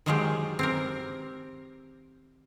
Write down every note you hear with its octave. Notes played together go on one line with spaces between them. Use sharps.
D#3 F3 F#3 G#3 F4 G4
C4 G4 A#4